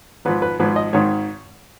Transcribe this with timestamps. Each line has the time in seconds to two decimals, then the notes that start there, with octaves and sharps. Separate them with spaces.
0.25 G#1 G#2 F3 B4
0.42 B4
0.59 G#1 G#2 F3 B4
0.76 D#5
0.93 G#1 G#2 D#3 C#5